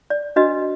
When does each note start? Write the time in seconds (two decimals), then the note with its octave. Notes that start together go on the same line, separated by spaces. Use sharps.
0.10 D5
0.36 D4 F#4 B4 D#5